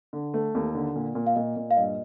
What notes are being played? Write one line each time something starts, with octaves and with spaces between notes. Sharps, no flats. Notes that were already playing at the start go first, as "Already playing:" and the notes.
D3
A3
D#2
D3
A#2
A#2
F5
A#2 D#5
A#2
F5
G2 D#5